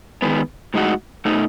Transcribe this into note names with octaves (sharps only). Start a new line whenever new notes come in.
D#3 G#3 B3
A2 G#3 D#4 F#4
B2 A3 D#4